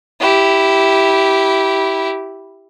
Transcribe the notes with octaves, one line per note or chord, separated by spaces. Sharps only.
E4 G4